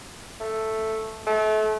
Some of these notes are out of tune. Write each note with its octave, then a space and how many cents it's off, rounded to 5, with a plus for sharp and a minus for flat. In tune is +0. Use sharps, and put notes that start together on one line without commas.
A3 +0
A3 -35